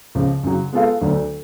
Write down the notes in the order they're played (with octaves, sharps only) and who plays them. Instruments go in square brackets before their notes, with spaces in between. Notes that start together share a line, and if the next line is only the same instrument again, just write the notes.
[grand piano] C#2 C#3 F3
F#2 C#3 F#3
G#3 B3 F4 A4 F5
D2 D3 F#3 A3 D4